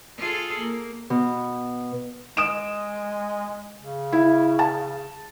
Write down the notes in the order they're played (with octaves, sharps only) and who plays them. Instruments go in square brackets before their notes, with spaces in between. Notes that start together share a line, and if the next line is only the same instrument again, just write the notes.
[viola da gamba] F4 G#4 A4
A#3
[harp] B2
[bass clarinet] G#3 [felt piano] D#6 D7 E7
[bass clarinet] C#3
[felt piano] E4
A5